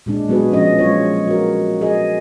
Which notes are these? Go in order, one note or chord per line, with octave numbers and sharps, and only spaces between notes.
A#2 G#3 D4
F#3 G#3 B3 F#4 G#4 B4
F3 C#4 D#5
F#3 G#3 F4 C#5
F#4 A#4
G#4 D#5